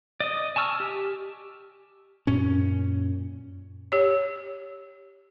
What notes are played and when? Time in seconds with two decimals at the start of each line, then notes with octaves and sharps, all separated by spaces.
0.20 D5 D#5 D#6
0.56 G#5 A5 C#6 E6 F6
0.80 G4
2.27 F#2 A#2 C#4
3.92 G4 C#5